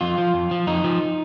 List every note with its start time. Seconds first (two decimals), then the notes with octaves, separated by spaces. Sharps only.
0.01 F2 F4
0.18 F3
0.34 F2
0.51 F3
0.67 F2 D#4
0.84 F3